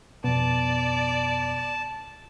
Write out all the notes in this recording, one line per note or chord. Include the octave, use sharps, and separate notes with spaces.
F2 B2 B3 D5 A5